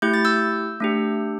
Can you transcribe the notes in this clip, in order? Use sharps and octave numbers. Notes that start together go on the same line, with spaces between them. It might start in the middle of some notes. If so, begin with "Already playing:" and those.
A3 E4 G4 G6
A6
E6 G6
A3 D4 G4